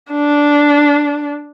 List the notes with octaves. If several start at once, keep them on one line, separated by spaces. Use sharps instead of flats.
D4